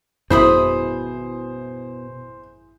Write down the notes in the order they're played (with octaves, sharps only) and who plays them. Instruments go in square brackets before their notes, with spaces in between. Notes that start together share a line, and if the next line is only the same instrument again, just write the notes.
[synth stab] G#1 F#2 E4 [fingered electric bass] B2 [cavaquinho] G#4 B5 D#6 [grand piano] C5